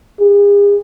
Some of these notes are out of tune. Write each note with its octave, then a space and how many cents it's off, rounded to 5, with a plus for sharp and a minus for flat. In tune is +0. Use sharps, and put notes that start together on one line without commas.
G#4 -40